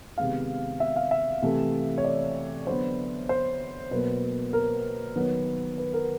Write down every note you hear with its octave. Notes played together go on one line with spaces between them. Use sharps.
C3 D#3 G#3 B3 F5
E5
F5
E5
C3 E3 A3
C#5
D5
D3 F#3 B3 C5
C5
B2 F#3 A#3 B4
A#4
D#3 F#3 B3 B4
B4
A#4